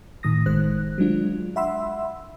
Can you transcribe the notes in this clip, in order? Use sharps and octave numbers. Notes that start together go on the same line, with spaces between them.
A2 D#3 D#6 A#6
G1 D#3 G#3 C5 F#6
F#3 G#3 D4 F4
E5 F#5 B5 C6 E6